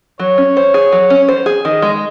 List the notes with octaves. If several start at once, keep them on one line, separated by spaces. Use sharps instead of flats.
F#3 C#5
C#4
C5
G#4
F#3
C#4
C5
G#4
D#3 D#5
G#3